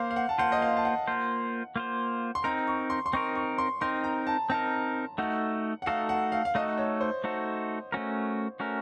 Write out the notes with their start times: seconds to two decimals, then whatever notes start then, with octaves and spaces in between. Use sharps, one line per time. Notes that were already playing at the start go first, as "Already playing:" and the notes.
Already playing: A#3 C5 F5
0.10 F5
0.16 F#5
0.29 A5
0.38 A#3 F4 C5 F#5
0.52 D#5
0.62 F5
0.77 A5
0.85 F#5
1.07 A#3 F4 C5
1.76 A#3 F4 C5
2.35 C6
2.44 C4 D#4 A#4 A#5
2.67 C#6
2.90 C6
3.06 C6
3.13 C4 D#4 A#4 C#6
3.35 C#6
3.58 C6
3.81 C4 D#4 A#4 C6
4.04 A#5
4.27 A5
4.50 C4 D#4 A#4 A5
5.18 A3 D#4 F#4 A4 F#5
5.82 F#5
5.86 A3 D#4 F#4 A4 F5
6.09 F#5
6.32 F5
6.45 F5
6.55 A3 D#4 F#4 A4 D#5
6.78 C#5
7.01 C5
7.24 A3 D#4 F#4 A4
7.92 A3 C#4 F#4 A#4
8.60 A3 C#4 F#4 A#4